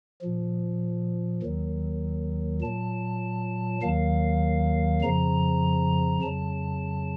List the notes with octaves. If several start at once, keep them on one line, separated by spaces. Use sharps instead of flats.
A#2 F3
D#2 D#3 F#3
A#2 F#3 A5
D#2 D#3 F#3 F5
F2 C#3 F3 A#5
F2 C#3 F#3 A5